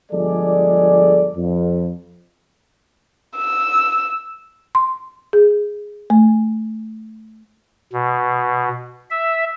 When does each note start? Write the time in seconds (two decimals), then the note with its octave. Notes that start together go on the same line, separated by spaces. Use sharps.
0.12 G1 F3 G#3 G#4 A4 D5
1.36 F2
3.37 E6
4.75 C6
5.33 G#4
6.10 A3
7.93 B2
9.11 E5